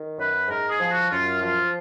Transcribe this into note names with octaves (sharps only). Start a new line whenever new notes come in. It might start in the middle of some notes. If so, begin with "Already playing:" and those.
Already playing: D#3
F#2 B4
G#2 A#4
G#4
F3
F#4
F#2 F4
F3 F4